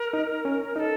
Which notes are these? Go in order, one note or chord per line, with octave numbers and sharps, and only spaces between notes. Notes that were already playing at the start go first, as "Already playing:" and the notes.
Already playing: A#4
D#4
C#4
D#4 A4 A#4